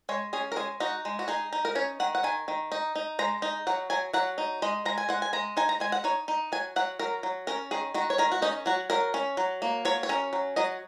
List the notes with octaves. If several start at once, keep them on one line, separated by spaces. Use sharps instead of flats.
G#3 C#5
C#4 G#4
A#4
G#3 G#4
D#4 F#4
G#3
F#4
D#4 G#4
D#4
A#4
C#4 C#5
D#3 F#5
F#5
D#3 G#5
D#3
D#4
D#4
G#3 A#5
D#4
F#3 F#5
F#3 G#5
F#3 F#5
D#4
G#3 D#5
G#3 A#5
G#5
G#3 F#5
G#5
G#3 A#5
D#4 G#5
A#5
G#3 G#5
F#5
D#4 C#5
D#4
F#3 G#5
F#3 F#5
F#3 A#4
F#3
C#4 A#4
D#3 G#4
D#3 F#4
C#5
D#3 A#4
F#4
C#4 D#4
F#3 F#4
F#3 A#4
C#4
F#3
A#3
F#3 C#5
C#5
C#4 A#4
F#3
F#3 D#5